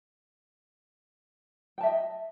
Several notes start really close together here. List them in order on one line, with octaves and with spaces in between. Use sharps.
G5 A5 E5 D#5